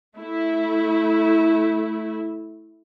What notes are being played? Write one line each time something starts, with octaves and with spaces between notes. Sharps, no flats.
A3 E4